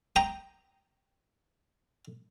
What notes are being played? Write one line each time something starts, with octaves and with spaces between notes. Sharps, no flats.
G5 A#5 D#6